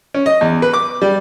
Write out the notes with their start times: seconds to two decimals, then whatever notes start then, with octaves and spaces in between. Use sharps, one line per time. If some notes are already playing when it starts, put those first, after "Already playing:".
0.14 C#4
0.26 D#5
0.41 E2
0.62 B4
0.73 D6
1.02 G3